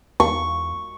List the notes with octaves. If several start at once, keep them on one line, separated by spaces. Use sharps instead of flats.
E2 C#6